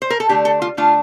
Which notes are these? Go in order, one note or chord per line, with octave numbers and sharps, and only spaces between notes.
C5
A#4
A4
D3 A3 D4 G4
A4
F4
D3 A3 D4 F4